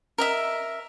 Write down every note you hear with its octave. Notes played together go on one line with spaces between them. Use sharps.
A#4 D#5 E5